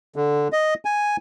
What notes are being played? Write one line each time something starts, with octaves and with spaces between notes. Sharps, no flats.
D3
D#5
G#5